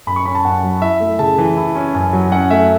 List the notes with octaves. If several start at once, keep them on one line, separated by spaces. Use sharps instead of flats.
F#2 B5
C#6
C#4 B5
A5
F#2 F#5
F#3
E4 E5
A3
C#3 A5
E3
E4
C#4
F#2
F#3
C#4 F#5
A3 E5